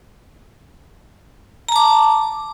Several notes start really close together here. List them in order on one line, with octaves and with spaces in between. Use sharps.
A#5 A5 D6